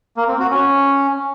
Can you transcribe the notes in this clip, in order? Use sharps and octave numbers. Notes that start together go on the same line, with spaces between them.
A#3
C4
F#4
C#4